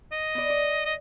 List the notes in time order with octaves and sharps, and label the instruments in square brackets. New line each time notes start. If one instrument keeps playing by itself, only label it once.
[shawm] D#5
[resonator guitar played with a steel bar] B3 D5
D5
[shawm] D#5